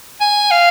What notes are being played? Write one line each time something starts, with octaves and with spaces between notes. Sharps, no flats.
G#5
F5